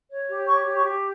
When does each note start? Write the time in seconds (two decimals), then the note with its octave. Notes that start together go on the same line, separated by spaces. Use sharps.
0.10 C#5
0.28 G4
0.47 C#5 C#6
0.67 G4
0.75 C#6
0.84 G4